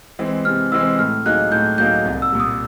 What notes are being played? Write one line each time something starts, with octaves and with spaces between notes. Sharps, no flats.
E3 G#3 C4
C3 F6
E3 G#3 C4 E6
A2 F6
F#3 A#3 D#4 G#4 F#6
A2 G6
F#3 A#3 D#4 G#4 G6
C2
E6
A#2 G3
D#6